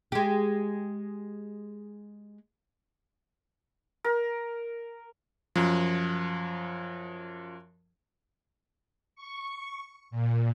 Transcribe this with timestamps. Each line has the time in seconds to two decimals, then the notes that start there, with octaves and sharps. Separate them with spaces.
0.12 G#3 G4
4.04 A#4
5.56 F#2 F3
9.15 C#6
10.11 A#2